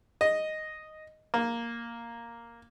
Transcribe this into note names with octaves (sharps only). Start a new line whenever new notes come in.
D#5
A#3